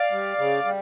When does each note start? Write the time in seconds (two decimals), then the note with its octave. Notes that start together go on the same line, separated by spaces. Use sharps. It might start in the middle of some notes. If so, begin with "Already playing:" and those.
Already playing: D5 F5
0.11 G3
0.38 C#3
0.65 G3